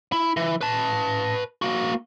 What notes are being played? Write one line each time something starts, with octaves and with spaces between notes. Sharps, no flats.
E4
E3
B4 A5
A#3 F#4